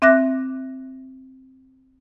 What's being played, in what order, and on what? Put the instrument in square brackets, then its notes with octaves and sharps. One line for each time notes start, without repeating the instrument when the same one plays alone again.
[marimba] C4 E5 D6 F#6 A#6